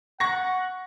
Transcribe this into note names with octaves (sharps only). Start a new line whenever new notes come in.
F#5 C#6 A#6